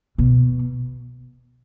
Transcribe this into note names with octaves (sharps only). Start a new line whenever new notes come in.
B2